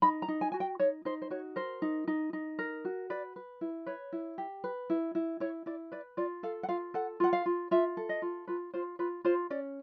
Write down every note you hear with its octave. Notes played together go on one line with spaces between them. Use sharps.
D#4 B5
A#5
D#4
G#5
F#4 G#5
G5
D#4 C#5
D#4 C5
C5
F#4 C#5
A#4 C5
D#4
D#4
D#4
A#4
F#4
B4 D5
B4
E4
B4 C#5
E4
G4
B4
E4
E4
E4 C#5
E4 D5
B4 D5
F4 D5
A4 F5
F#5
F4 F5
A4 F#5
F4 F#5
F5
F4
F4 E5
A4
D#5
F4
F4 B4
F4 C5
F4 B4
F4 C5
C#4 D5